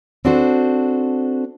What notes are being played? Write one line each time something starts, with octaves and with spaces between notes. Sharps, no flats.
C4 D4 F#4 A4 C5